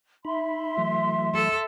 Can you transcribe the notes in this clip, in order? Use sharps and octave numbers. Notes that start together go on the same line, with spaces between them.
D#4 E5 B5 C6
E3 F#3 A3
A4